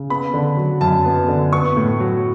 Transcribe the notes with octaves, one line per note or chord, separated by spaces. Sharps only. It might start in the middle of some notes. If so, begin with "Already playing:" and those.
Already playing: C#3
B3 B5
D3
F#3
F#2 A5
B3
D3
B3 C#6
A2
F#3